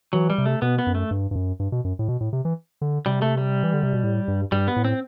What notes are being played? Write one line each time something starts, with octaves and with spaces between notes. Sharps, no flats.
E3 F#3
G3
C3
A3
B2 B3
B3
F#2
A3
G2
G2
F#2
G2
B2
F#2
A2
B2
A2
C3
E3
D3
C3 G3
A3
G3
E3
D3
C3
B2
A2
G2
G2 G3
B3
A2
C4